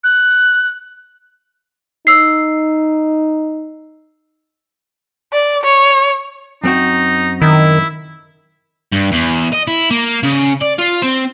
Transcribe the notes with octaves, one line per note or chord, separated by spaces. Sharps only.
F#6
D#4 E6 C7
D5
C#5
F#2 C4 D#4 F#4
D#3 E4
G2
E2
D#5
E4
A#3
C#3
D5
F4
C4